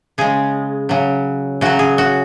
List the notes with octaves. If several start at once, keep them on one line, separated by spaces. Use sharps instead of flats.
C#3 G#3 G#4
C#3 F#3
C#3 F#3 F#4
G#4
F#4